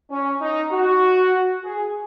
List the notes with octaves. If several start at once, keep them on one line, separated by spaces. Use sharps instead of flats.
C#4
D#4
F#4
G#4